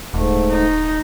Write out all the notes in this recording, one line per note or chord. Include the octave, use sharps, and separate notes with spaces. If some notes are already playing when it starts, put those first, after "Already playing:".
D#1 G#2 A3
D#4